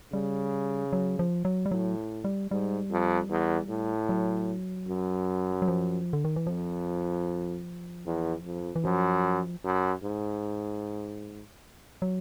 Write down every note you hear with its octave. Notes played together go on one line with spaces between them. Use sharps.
C#3 G3
F#3
F3
F#3
G3
A2 F#3
G3
G#2 G3
F2
E2
A2
F#3
F#2
F#3
F3
D3
D#3
E3
F2 F3
E2
F2
E3
F#2 F3
F#2
G#2
F#3